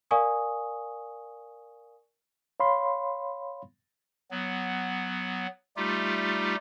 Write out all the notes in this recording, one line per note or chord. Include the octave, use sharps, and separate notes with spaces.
A#4 D5 F5 G#5 C#6 D#6
C#5 F5 B5 C6
F#3 B3
G3 A3 D#4 F4 G4